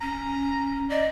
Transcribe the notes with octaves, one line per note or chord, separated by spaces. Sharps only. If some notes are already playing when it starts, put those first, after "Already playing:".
C#4 A#5
D5 D#5